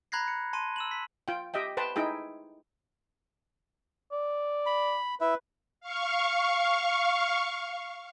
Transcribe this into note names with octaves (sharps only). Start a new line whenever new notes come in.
A#5 B5 F#6 G#6 A#6 C7
C#7
A5 C6 D#7
E6 E7 F#7
B6
F4 G5
G4 D#5 E5 G5
B4 C5 G5 A5
D#4 E4 G#4 G5
D5
B5
E4 B4 E5
F5 C#6